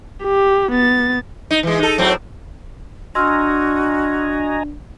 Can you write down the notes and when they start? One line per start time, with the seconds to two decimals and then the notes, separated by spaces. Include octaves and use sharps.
0.24 G4
0.72 B3 A6
1.51 D#4
1.63 E3 G#3
1.79 D#4 A4
1.98 A2 F#3 C4
3.15 D4 F#4 D#5 G#5 A#5 C6 E6 F6